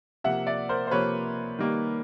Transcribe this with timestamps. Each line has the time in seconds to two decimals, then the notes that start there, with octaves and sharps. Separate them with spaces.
0.24 C3 F3 A#3 E5 F#5
0.47 D5 E5
0.69 A#4 C5
0.87 C5
0.91 C3 F3 A#3 B4 C#5
1.59 D#3 G3 A#3